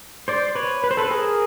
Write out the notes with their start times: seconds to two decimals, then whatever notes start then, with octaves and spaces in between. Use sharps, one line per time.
0.28 C5 D5
0.55 B4 C#5
0.84 B4
0.91 C5
0.97 A4 B4
1.11 G#4 A#4